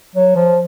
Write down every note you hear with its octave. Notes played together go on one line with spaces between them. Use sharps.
F#3
F3